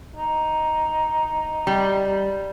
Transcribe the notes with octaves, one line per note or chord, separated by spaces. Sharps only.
D#4
G3